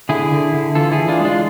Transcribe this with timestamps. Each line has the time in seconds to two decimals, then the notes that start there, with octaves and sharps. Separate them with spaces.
0.09 D3 E4 G#4
0.32 D3
0.53 D3
0.75 E3 F4 A4
0.92 E4 G#4
0.98 E3
1.09 D4 F4
1.20 G#3 D4 F4